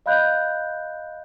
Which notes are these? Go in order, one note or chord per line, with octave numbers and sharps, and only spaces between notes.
D#5 F5 B5 F#6 G6